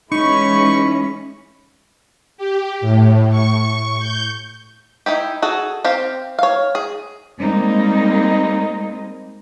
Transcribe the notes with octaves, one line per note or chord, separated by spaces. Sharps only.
E3 G#3 C#4 D#4 B5 C#6
G4
A2
C#6
G6
D#4 E4 G4
F#4 G#4 A4
C4 G4 F5
C#5 F5
G#4
G3 G#3 A#3 C4 D#4